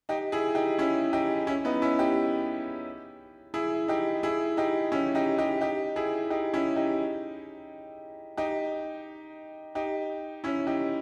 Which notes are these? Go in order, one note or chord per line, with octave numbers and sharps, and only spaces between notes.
D#4 G4
E4 G#4
D#4 G4
C#4 E4
D#4 G4
C#4 E4
B3 D#4
C#4 E4
D#4 G4
E4 G#4
D#4 G4
E4 G#4
D#4 G4
C#4 E4
D#4 G4
D#4 G4
D#4 G4
E4 G#4
D#4 G4
C#4 E4
D#4 G4
D#4 G4
D#4 G4
C#4 E4
D#4 G4